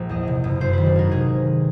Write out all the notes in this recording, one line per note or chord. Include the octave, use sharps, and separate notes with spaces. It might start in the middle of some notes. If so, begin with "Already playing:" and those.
Already playing: A#1
E2 D#5
C3
F#1
F#2 C5
D#3 B4
B4
G#1 A#4
C3 G#4